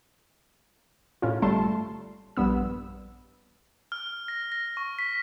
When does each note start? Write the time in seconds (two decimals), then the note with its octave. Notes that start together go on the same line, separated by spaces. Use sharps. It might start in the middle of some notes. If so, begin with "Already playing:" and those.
1.22 A2 C#4 F4
1.42 G1 G3 A3 A5 C6
2.37 A#1 G2 B3 E6
3.92 F6
4.28 A#6
4.52 A#6
4.77 C#6
4.99 B6